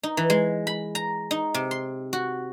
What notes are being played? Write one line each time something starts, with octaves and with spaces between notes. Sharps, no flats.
D#4
E3
G#3
B5
A#5
D#4
C3
C6
F#4